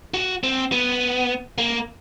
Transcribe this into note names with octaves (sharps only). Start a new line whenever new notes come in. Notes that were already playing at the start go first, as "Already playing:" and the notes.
F#4
C4
B3
A#3